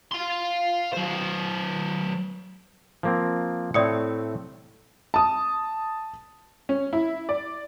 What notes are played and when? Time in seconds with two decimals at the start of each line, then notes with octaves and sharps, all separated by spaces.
0.11 F5 C6
0.92 F#3 C5
3.03 F3 A#3 C4
3.74 A2 A3 C4 D5 D#6 C#7
5.14 A5 D#6
6.69 C#4
6.93 E4
7.29 D5